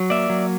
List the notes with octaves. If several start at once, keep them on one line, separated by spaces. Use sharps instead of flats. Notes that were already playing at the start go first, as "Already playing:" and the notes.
Already playing: F#3
A#3 D5 E5
F#3